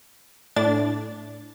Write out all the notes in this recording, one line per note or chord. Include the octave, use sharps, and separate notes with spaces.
A2 D4 A6